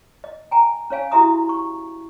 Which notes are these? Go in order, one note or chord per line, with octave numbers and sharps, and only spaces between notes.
D#5
G5 G#5 A#5
C#4 C#5 F5 G#5
E4 F#4 G4 E5 A#5 D#6
C#6